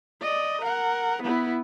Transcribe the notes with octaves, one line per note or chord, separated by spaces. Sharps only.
D5 D#5
A#4 F#5
B3 E4